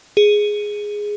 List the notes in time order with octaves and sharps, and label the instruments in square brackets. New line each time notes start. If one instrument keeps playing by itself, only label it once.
[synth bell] G#4